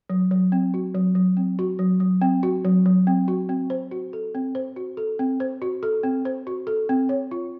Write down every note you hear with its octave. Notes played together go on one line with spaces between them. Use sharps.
F#3
F#3
C4
F#4
F#3
F#3
C4
F#4
F#3
F#3
C4
F#4
F#3
F#3
C4
F#4
C4
C5
F#4
A4
C4
C5
F#4
A4
C4
C5
F#4
A4
C4
C5
F#4
A4
C4
C#5
F4